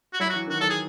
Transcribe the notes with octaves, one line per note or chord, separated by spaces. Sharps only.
F#4
F#3 E4
E3 F#4
D#3 F#4
F#3 A4
G#4